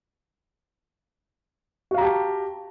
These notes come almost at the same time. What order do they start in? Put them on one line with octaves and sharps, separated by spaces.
F#4 F5 A#5 G4 A5